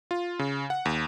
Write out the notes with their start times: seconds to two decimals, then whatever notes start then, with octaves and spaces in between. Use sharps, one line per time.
0.11 F4
0.39 C#3
0.70 F#5
0.85 D#2